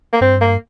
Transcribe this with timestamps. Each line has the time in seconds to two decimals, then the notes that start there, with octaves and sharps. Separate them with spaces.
0.13 A#3
0.21 G2 C4
0.41 A#3